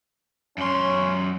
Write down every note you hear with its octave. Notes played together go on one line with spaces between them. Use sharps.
F#2 C#4 C6